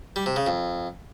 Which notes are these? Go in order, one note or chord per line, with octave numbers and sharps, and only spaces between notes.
G3
C3
C#3
F2